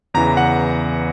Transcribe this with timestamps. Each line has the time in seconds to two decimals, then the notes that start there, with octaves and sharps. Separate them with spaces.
0.14 E2 C#3 E3 A#5
0.37 F#5